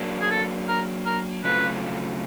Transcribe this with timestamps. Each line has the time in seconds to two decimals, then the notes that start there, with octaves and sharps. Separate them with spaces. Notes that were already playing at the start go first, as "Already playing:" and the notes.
Already playing: F#3 A#3 D4
0.21 G#4
0.31 A4
0.68 A#4
1.06 A#4
1.44 C#3 F#3 A3 C4 F4 B4